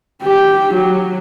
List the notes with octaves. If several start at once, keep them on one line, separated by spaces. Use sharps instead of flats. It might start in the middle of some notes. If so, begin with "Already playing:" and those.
G4
F#3